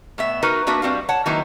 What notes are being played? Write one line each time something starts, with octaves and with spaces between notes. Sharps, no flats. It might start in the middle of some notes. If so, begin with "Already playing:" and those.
A2 B3 E5
D#4 F#4 A#4 B4
A#3 D4 F#4 B4 E5
G3 C4 F#4 F5
C#5 F#5 A5
D#3 F#3 A#3 D#4 E4 B4